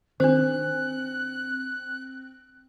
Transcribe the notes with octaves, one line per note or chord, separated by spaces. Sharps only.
D#3 C4 D4 C5 F#6